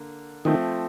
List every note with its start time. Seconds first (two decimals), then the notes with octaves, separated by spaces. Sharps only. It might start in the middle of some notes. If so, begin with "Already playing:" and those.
Already playing: D3 A#3
0.45 D#3 F3 A3 C4